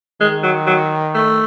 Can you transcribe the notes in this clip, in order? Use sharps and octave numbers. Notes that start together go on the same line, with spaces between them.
D#3 G#3
F#3
F#3
A3